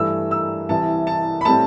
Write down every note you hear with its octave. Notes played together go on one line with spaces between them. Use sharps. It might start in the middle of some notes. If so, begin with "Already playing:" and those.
Already playing: G2 E3 A3 E6
E6
C2 C3 E3 A5
A5
B5
A2 G3 C4 A5